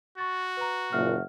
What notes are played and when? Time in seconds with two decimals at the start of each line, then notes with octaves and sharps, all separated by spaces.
0.18 F#4 C#6 A6
0.57 B4 A#5
0.93 F#1 A#2 E5 F#5 F6